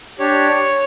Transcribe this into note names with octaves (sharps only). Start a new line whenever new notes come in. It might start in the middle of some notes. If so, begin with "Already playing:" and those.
D4 G4 C#5